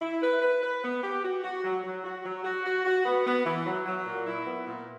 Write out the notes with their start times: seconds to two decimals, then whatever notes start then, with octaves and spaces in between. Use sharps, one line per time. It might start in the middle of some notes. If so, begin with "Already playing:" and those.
0.02 E4
0.22 B4
0.42 B4
0.62 B4
0.83 B3
1.03 G4
1.23 F#4
1.44 F#4
1.63 F#3
1.84 F#3
2.04 F#4
2.24 F#3
2.44 F#4
2.65 F#4
2.85 F#4
3.05 B3
3.26 B3
3.45 E3
3.66 F#3
3.85 F#3
4.07 A#2
4.27 E4
4.47 B3
4.67 A#2